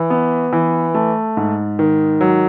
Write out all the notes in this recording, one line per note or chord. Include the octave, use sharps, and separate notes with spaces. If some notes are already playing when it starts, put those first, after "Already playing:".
Already playing: E3
B3
E3
A3
G#2
D#3
F#3